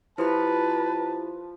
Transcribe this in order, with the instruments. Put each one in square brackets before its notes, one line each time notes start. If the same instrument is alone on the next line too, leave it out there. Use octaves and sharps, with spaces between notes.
[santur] F3 [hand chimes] E4 G4 B5 [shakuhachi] B4 [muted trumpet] A5